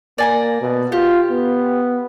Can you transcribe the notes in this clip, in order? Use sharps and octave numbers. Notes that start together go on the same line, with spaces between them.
A#3 D5 G#5 A#5
B2
F4 G4
B3